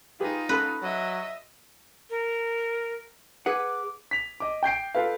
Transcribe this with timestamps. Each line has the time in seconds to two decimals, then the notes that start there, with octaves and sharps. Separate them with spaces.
0.20 D#4 F4 G4 G#4 B4
0.49 C#4 A4 B4 B5
0.82 F#3 D#5 E5
2.10 A#4
3.46 G#4 B4 F#5 D6
4.11 B6 F7
4.40 D#5 D6
4.63 G5 G6 C7 D7
4.95 F4 A4 B4 F5